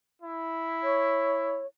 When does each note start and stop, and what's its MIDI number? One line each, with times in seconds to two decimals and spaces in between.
0.22 1.63 64
0.83 1.66 73